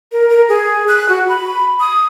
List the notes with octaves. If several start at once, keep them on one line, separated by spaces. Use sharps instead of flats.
A#4
A#4
G#4
F#6
F#4
B5
D#6